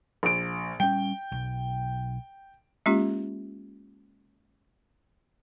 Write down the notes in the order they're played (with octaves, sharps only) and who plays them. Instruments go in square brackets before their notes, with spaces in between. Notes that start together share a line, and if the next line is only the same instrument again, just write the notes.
[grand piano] A#1 D7
[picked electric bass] G3 C#4 [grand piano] G5
[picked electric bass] B1
[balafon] G#3 A#3 C#4 F4 G4